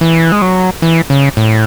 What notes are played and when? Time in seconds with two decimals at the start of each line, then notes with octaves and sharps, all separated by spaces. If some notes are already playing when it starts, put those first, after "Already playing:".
0.01 E3
0.32 G#3
0.42 F#3
0.82 E3
1.10 C#3
1.37 A2